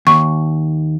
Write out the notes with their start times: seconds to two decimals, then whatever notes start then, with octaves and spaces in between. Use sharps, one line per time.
0.07 D#2 C#6